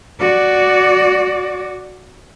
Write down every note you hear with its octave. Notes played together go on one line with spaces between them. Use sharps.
F#4 D5